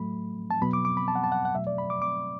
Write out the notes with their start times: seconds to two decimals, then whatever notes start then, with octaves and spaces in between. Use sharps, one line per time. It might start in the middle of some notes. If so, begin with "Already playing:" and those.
Already playing: A2 F#3 A3 B5
0.51 A5
0.62 B2 F#3 B3 B5
0.73 D6
0.85 D6
0.97 B5
1.08 A5
1.15 F#5
1.24 A5
1.32 F#5
1.45 F#5
1.55 B2 F#3 A3 E5
1.67 D5
1.78 B5
1.90 D6
2.02 D6